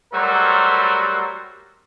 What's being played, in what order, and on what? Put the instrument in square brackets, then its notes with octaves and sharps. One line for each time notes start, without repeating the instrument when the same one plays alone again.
[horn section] F#3 G3 A3 F#4 A#4 C5